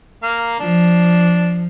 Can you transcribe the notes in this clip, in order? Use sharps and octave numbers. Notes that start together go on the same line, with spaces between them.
A#3 F5
F3 D4